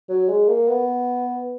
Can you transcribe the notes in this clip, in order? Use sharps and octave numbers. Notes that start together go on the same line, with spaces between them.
F#3
G#3
A#3
B3